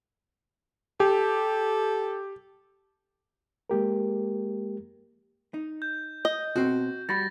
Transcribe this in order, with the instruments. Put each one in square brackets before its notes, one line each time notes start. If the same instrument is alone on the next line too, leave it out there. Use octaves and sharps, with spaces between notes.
[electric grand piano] G4 [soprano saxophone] A4
[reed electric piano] G#3 A#3 G4 A#4
[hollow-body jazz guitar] D#4
[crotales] G6
[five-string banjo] D#5
[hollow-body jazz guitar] B2 C4 [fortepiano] F#4
[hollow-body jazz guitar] G3 F#4 B5 [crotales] A6 A#6